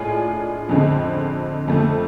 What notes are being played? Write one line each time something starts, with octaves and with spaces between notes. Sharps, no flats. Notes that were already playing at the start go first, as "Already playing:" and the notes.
Already playing: A2 G#3 D4 F4 G#4
F2 D3 G#3 C4
F2 D3 A3